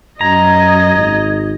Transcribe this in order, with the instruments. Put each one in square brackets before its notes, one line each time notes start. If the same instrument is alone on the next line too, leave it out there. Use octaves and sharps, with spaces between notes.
[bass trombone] F#2 [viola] D#5 [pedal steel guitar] A#5 [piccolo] G#6
[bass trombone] G#1